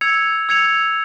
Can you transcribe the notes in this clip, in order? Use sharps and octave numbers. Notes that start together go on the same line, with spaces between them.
E6 G#6 C#7 F7
E6 G#6 C#7 F7